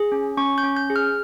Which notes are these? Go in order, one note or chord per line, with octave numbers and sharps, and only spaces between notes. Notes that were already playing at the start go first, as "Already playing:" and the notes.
Already playing: G#4
C#4
C#4 C#6
G6
C#4
G6
G#4
F6